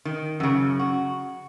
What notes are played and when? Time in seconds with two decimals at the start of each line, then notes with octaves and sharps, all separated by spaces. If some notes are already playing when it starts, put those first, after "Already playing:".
0.05 D#3
0.40 F#2 C#3
0.79 F#4